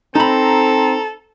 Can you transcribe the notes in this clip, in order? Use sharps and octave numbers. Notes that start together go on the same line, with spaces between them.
C4 D#4 A4 A#5 B5